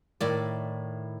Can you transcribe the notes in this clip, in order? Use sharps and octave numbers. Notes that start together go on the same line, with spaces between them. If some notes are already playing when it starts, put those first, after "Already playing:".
A2 D#3 E4 D5